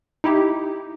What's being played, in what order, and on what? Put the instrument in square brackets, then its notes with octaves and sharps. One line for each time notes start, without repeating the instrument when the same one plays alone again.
[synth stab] D#4 E4 G4